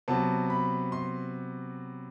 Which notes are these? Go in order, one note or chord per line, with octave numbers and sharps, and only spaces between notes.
C3 F#3 B3 A5
B5
C6